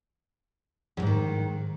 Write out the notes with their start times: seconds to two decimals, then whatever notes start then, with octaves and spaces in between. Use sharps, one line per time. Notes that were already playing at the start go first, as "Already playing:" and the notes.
0.97 E2
1.02 G#2
1.07 D#3